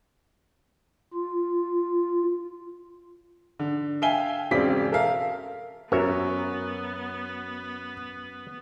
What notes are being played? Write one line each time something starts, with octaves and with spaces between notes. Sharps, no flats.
F4
D3
E5 F5 G5 G#5 G7
E1 C#3 C4 D5 B6
A4 A#4 E5 F5
F#2 B3 F#4 A#4 C#5 E5